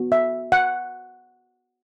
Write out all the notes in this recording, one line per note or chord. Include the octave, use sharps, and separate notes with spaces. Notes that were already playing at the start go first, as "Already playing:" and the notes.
Already playing: B3 F#4
E5
F#5